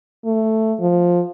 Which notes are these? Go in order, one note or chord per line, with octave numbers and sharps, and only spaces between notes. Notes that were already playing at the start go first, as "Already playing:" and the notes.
A3
F3